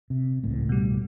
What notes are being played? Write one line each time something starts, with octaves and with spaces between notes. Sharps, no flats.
C3
G#1 C#2 A2
B2 G3